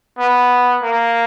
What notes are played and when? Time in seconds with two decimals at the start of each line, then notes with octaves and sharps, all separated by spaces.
0.19 B3
0.83 A#3